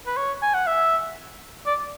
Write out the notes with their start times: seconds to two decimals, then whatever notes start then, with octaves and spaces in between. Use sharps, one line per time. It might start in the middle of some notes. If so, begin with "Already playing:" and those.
0.06 B4
0.17 C#5
0.42 G#5
0.54 F#5
0.67 E5
1.66 D5